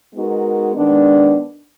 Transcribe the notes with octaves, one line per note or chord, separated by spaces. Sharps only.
G#3 B3 D#4 F#4 A#4
D#3 G#3 B3 D4